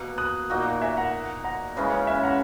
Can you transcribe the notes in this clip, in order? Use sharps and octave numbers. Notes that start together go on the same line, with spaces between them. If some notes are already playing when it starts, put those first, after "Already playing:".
Already playing: B2 A#3
D#6 F#6
A#2 A#3 D#4 F#4
E5 G#5
F#5 A#5
F#5 A#5
C#3 E3 G#3 C#4
E5 G#5
F#5 A#5